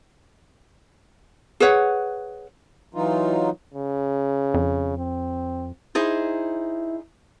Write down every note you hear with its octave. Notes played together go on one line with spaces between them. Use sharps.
G#4 B4 C#5 F#5
E3 F#3 D#4 F4
C#3
F2
C4
D#4 E4 G#4 C5